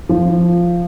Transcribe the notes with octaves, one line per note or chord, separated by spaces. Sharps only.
F3